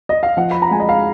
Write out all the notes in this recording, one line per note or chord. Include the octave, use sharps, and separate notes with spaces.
D#5
F5
F3 F#5
B5
A#5
G#3 G#5
D#5
F5